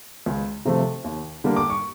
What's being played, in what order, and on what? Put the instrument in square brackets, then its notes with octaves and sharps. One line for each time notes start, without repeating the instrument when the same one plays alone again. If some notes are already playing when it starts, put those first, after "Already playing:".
[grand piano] C#2
C3 F3 A3
D#2
D3 G3 A#3
D6
C#6